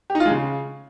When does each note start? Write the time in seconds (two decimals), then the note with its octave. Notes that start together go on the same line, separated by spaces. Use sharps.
0.10 G4
0.15 D#4
0.20 F4
0.26 G#3
0.31 C#3